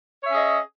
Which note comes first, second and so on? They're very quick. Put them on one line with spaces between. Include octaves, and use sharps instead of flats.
C#5 E5 C#4 G#4 D#5